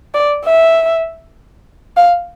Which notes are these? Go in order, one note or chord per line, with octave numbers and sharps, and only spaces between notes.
D5
E5
F5